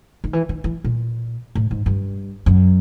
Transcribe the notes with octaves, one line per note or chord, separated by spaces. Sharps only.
D#3
E3
D#3
E3
A#2
A2
G#2
G2
F#2